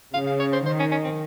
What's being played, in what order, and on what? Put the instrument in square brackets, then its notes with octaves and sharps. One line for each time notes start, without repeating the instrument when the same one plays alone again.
[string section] C#3 [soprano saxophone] F5
[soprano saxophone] F5
C#5
C5
[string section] D#3 [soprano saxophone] C5
[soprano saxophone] C#4
C#4
C4